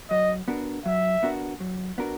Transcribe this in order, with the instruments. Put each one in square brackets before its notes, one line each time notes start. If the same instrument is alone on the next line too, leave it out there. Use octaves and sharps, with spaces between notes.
[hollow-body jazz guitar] F#3 [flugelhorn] D#5
[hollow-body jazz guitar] B3 D4 F#4 A#4
[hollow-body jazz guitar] F#3 [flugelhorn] E5
[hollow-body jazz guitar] B3 D4 F#4 A#4
F#3
B3 D4 F#4 A#4